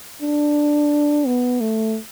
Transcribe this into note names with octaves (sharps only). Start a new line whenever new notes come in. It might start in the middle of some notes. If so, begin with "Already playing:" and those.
D4
B3
A3